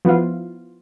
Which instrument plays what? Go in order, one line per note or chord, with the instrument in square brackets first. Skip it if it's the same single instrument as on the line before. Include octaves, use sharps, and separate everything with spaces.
[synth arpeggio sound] F3 B3 E4 F4